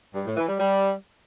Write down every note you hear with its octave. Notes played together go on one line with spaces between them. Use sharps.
G2
A2
E3
G3
G3